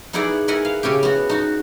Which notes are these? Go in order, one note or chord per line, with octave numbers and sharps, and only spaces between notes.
B3 D#4 E4 G#4 D5 F#5
E4 A#4 B4 D#5 F#5 G#5
F5
C#3 C#4 E4 G4
B3 F#4
D#4 F#4